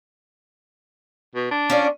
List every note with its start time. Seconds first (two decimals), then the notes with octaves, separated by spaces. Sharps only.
1.35 B2
1.51 D4
1.70 C#4 F4 D5